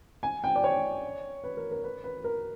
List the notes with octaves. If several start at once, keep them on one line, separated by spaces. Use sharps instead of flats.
G#5
G5
D5
C#5
B4
A#4
A#4
B4
B4
A#4